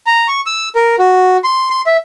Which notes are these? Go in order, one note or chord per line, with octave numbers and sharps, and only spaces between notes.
A#5
C#6
E6
A#4
F#4
C6
C6
E5